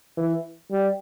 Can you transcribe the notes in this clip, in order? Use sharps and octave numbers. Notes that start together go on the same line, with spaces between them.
E3
G3